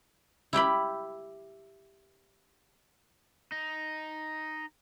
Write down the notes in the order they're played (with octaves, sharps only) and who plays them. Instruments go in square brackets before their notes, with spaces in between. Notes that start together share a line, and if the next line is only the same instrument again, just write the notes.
[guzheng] E4 G4 G5 B5
[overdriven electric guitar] D#4